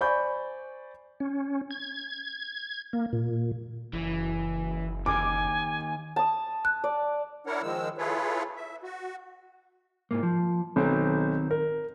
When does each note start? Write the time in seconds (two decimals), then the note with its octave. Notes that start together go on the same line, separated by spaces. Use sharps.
0.01 C5 D5 G#5 B5 C#6 G6
1.20 C#4
1.71 G#6
2.93 A#3
3.13 A#2
3.93 F#1 E3
5.06 D#2 G#5 D6
6.16 A5 D#6
6.65 F#6
6.84 D5
7.47 D4 E4 A#4 C#5 F#5
7.63 D#3 F3 G#3 E6
7.98 E4 F4 G#4 A4 B4 C#5
8.56 E5
8.83 F#4
10.11 G#2 A#3
10.23 F3
10.76 B1 D#3 C4
11.51 A#4